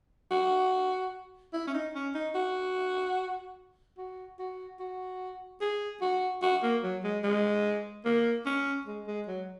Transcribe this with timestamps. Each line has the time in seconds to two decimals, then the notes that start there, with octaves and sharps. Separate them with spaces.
0.31 F#4
1.53 E4
1.67 C#4
1.74 D#4
1.95 C#4
2.15 D#4
2.35 F#4
3.98 F#4
4.39 F#4
4.80 F#4
5.61 G#4
6.01 F#4
6.42 F#4
6.63 A#3
6.83 F#3
7.04 G#3
7.23 G#3
8.05 A#3
8.46 C#4
8.87 G#3
9.07 G#3
9.27 F#3